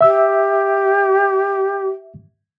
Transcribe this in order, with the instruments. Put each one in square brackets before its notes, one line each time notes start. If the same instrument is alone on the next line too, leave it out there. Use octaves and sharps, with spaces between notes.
[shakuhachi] G4 [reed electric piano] E5 E6